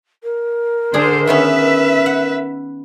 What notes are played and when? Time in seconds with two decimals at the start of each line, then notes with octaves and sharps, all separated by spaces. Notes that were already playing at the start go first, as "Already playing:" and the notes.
0.23 A#4
0.94 D3 D4 G#4 C5
1.27 D#3 B3 C#4 B4 E5
2.06 F#5